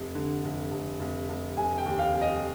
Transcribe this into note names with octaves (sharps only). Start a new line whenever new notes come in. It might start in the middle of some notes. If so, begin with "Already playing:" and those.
Already playing: F1
D3
F1
F1
F1
F1
F1 G#5
G5
D#2
F5
F1
D#5